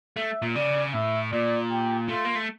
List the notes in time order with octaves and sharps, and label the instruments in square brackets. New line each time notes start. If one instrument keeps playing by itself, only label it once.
[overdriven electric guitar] A3 [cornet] E5
[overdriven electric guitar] A#2
[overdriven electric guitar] C#3 [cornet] D5
[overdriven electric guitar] A2 [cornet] E5
[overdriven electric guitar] A#2 [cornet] D5
[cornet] G4
[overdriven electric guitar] A3 [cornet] F4
[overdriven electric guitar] A#3
A3